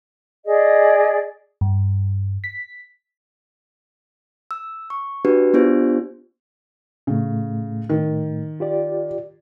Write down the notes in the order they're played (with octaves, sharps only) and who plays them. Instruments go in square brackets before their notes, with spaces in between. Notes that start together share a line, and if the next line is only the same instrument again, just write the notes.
[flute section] G#4 D5 D#5
[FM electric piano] G2
B6
[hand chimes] E6
C#6
D4 F#4 G4 B4
B3 D4 F4 G4 C5
[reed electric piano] A2 A3 [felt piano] C#3
[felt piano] D#3
[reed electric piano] F4 G4 D5